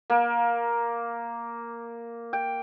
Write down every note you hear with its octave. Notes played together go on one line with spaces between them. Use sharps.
A#3
G5